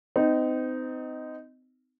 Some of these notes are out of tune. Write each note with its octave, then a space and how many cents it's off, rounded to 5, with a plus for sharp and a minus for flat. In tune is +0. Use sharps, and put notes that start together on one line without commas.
C4 -35 D#4 +0